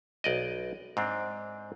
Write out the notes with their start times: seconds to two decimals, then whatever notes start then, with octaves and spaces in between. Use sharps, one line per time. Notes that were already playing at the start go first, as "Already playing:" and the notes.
0.24 B1 D5 D#5
0.97 G#2 C4 D4